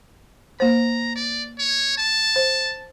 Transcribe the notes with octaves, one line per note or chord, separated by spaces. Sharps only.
A#3 C5 A#5
D5
C#5
A5
C5